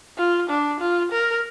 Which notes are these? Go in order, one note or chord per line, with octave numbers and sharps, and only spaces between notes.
F4
D4
F4
A#4